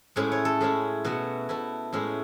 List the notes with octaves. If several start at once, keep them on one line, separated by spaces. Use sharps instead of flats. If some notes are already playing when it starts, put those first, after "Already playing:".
A2 G#3 C#4 E4
C#5
A4
A2 G#3 C#4 E4
B2 A3 E4 F#4
B2 A3 E4
A2 G#3 C#4 E4